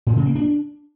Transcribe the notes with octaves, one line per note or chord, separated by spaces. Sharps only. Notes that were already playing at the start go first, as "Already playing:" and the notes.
A2
C#3
A#3
D4